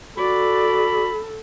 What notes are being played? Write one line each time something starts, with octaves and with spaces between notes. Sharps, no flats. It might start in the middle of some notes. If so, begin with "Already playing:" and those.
F#4 A4 D5 B5